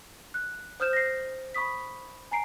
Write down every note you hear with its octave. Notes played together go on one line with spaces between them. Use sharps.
F#6
C5 D#6 F6 G6 E7
A#6 C7
B5 C#6 D#6 B6
G#5 A#5 C7 D7